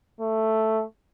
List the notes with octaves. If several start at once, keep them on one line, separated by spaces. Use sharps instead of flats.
A3